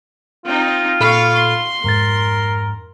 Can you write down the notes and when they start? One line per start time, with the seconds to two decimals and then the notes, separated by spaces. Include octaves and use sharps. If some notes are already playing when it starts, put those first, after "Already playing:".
0.45 C4 D#4 F4
1.00 A#2 A4 F5 B5 C#6
1.35 C6
1.84 F2 G#2 A#4 A6